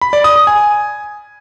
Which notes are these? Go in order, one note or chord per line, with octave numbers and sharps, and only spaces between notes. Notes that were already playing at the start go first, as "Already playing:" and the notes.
B5
D5
D#6
D#6
G#5